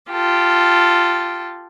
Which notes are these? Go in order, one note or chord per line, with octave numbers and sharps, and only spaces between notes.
F4 G4 A4